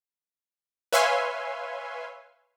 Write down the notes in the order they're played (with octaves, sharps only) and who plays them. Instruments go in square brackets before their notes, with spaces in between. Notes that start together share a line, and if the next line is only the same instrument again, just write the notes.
[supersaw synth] B4 C#5 E5 F5 G#5 C6